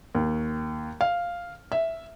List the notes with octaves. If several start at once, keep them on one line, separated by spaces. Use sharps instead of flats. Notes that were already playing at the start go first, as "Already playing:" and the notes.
D#2
F5
E5